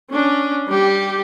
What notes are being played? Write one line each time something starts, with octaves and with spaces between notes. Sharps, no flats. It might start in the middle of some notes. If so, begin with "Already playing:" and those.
C#4 D4
G3 G4